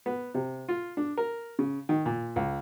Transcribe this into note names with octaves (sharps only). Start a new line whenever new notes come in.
B3
C3
F4
D4
A#4
C#3
D#3
A#2
C#2